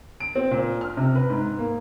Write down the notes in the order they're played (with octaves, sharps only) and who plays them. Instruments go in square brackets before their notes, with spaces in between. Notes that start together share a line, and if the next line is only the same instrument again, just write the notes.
[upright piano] D7
C4
A#2
F6
C3
B4
G#2
A#3